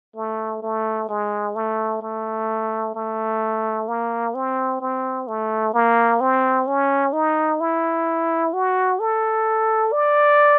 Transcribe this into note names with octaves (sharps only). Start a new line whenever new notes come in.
A3
A3
G#3
A3
A3
A3
A#3
C4
C4
A3
A#3
C4
C#4
D#4
E4
F#4
A4
D5